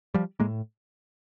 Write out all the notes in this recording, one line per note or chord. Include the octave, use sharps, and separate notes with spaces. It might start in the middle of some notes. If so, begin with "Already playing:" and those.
F3 G3
A2 G#3 A#3